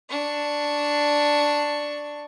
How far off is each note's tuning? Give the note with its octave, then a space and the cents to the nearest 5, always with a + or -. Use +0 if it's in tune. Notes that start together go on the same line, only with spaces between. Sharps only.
D4 +0 C#6 +0